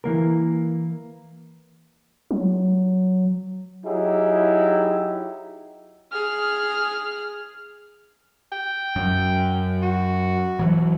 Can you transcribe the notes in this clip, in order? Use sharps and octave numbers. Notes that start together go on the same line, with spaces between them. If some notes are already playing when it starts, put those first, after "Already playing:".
E3 A#3 A#4
F#3
F#3 D#4 E4 G4 G#4
G#4 F6
G5
F#2
F#4
E3 F#3